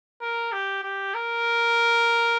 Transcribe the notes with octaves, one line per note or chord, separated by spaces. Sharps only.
A#4
G4
G4
A#4